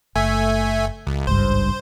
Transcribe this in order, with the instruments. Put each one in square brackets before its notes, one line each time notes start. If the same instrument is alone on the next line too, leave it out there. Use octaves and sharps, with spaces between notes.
[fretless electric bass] F#1 [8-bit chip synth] A3 E5 G#5
[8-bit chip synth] C#2
[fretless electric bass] G#1 C#2 G2 [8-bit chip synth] C5